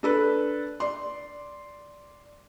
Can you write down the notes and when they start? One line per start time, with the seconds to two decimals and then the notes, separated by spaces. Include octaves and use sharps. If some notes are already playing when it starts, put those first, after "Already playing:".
0.03 D4 A4 B4
0.80 D5 C6